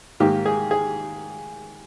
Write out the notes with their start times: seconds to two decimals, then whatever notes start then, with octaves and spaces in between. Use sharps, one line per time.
0.20 G#2 D#3 A#3 G4
0.46 G#4
0.71 G#4